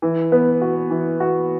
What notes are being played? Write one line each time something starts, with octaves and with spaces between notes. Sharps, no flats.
E3
B3
F#4
E3
F#4